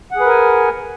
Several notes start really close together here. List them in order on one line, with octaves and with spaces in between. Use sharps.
F#5 G#4 B4 A#4 G#5